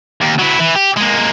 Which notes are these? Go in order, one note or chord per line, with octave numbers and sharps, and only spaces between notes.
D#2
F#3 E4
E3
G4
G#3 A#3